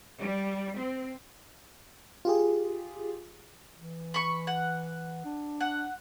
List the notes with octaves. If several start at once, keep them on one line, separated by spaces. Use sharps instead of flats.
G3
C4
F4 G4 G#4
E3
B5 C#6
F#5
D4
F#5